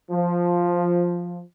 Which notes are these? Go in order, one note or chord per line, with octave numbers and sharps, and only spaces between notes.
F3